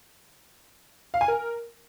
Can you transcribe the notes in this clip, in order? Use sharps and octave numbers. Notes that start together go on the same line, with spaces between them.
F5
G#5
A#4